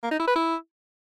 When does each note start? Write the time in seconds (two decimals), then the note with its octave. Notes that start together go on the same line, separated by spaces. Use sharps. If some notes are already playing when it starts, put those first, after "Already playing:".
0.03 A#3
0.11 D#4
0.19 E4
0.27 B4
0.36 E4